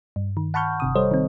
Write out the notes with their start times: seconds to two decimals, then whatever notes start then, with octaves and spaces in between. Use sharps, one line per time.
0.16 G2
0.37 D#3
0.54 F#5 A5 B5 C#6 F6 G6
0.80 G1 C3 D#6
0.95 G3 A4 C5 C#5 D#5
1.11 D#3 C4